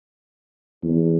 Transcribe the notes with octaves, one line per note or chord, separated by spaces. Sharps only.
E2